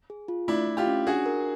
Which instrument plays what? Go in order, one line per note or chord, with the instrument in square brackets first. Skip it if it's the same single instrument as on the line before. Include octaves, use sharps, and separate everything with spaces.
[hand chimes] G#4
F4
[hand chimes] A3 [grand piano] D4 E4
[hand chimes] A3
[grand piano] F4 G4
[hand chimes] C#4
[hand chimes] D4 [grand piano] F#4 G#4
[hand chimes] A#4